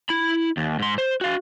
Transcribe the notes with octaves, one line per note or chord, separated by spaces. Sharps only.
E4 B5
D#2
G#2 C6
C5
F#4 F5